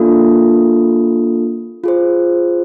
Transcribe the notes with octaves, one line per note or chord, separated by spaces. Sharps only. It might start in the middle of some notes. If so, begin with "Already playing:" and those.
Already playing: A#3 D4 F4 A4
F4 G#4 C5